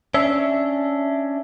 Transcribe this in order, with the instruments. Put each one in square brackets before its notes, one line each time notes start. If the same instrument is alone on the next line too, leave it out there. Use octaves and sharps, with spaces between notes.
[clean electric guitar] C#4 D4 [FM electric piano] E5